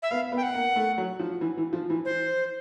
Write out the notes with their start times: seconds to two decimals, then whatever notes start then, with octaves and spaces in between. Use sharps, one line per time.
0.03 E5
0.11 B3 F5
0.32 B3
0.37 G5
0.43 F#5
0.54 A#3
0.76 A3
0.98 F#3
1.19 F3
1.41 E3
1.57 E3
1.73 F3
1.90 E3
2.05 C5